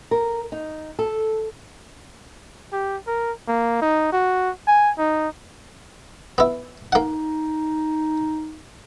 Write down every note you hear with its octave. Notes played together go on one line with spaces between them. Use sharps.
A#4
D#4
A4
G4
A#4
A#3
D#4
F#4
G#5
D#4
B3 E4
A#3 D#4 F#5